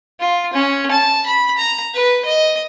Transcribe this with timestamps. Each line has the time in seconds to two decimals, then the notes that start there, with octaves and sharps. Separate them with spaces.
0.20 F4
0.53 C#4
0.91 A5
1.26 B5
1.58 A#5
1.94 B4
2.25 D#5